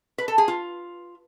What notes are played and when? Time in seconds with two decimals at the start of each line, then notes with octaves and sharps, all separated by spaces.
0.18 B4
0.28 A4
0.38 G#4
0.48 F4